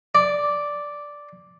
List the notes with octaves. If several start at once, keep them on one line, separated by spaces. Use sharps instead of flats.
D5